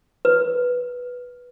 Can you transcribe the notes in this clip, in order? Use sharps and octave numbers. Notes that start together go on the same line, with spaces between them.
B4